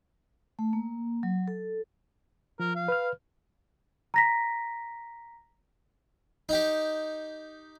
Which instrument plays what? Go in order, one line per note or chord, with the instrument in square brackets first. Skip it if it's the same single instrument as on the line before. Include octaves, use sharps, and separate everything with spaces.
[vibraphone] A3
A#3
F#3
A4
[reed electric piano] F3 [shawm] A#4
[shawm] F5
[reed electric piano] B4 F6
[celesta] A#5 A#6 B6
[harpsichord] D#4 G4